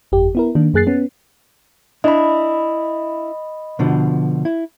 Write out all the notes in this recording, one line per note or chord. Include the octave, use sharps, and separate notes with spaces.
G1 F2 G4
B3 E4 A#4
D#3 A#3 D4
F#2 A#3 G#4 F#6 A6 C7
B3 C#4
D4 E4 D#5 B5
B2 D3 F3
E4